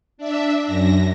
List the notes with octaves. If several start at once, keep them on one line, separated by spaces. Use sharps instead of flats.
D4 E5
F#2 A#6